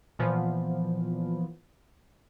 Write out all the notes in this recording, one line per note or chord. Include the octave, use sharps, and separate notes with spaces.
A#2 E3 F3 B3